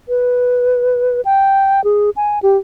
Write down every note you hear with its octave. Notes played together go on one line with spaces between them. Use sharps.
B4
G5
G#4
G#5
G4